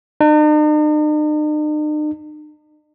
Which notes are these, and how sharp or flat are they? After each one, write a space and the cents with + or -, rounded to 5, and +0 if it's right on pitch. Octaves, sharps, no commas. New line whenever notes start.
D#4 -45